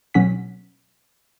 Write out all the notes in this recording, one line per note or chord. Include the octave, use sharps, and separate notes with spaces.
B2 F#3 C#4 F#5 B6